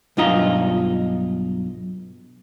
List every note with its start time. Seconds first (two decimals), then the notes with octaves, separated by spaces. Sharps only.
0.17 B1 G2 F4 D#5 A#5